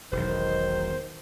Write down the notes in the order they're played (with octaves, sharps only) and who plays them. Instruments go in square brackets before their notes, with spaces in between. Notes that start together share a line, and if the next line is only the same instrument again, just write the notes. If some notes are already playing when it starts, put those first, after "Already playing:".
[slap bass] E1 B1 [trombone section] D#3 [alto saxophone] C5